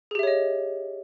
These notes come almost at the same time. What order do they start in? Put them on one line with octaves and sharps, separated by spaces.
G#4 G4 E5 C#5 D#5